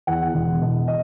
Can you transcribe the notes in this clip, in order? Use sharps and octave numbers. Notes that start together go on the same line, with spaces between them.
E2 F#5
E1
B2
D#5